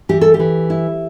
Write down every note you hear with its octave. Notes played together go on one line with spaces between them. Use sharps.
E3 G4
A4
G4
E3
E4